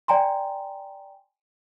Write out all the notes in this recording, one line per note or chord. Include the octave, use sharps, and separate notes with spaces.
D5 G5 G#5 A#5 C6